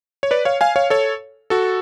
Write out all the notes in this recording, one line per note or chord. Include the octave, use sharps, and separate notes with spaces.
C#5
B4 D5
C#5 F5
F5 G#5
C#5 F5
A4 C#5
F#4 A4